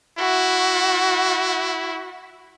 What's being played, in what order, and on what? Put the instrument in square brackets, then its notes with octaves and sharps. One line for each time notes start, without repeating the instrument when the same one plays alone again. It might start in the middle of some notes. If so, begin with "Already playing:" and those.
[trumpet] E4 [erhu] F#4